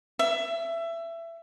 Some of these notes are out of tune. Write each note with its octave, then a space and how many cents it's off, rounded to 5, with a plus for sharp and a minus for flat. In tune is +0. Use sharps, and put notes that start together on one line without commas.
E5 +20